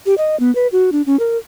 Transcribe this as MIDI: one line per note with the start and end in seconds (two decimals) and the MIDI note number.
0.06 0.15 67
0.18 0.38 75
0.40 0.53 59
0.55 0.67 71
0.72 0.90 66
0.92 1.02 62
1.06 1.19 61
1.20 1.37 70